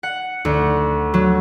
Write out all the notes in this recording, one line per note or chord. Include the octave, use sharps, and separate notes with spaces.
F#5
D2
F#3